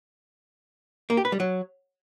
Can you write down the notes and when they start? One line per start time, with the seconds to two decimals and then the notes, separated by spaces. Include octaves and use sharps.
1.10 A#3
1.17 G4
1.25 B4
1.32 G3
1.40 F#3